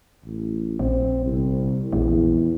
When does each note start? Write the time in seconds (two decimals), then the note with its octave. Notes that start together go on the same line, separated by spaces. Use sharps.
0.25 A1
0.79 A#1 C4
1.25 C2
1.93 A#1 E2